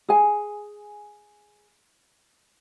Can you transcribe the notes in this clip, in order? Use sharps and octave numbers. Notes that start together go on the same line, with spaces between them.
G#4 G#5